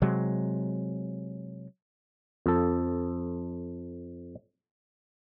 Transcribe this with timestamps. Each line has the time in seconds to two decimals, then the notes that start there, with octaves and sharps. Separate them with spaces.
0.02 C3 F#3 G#3
2.46 F2 A4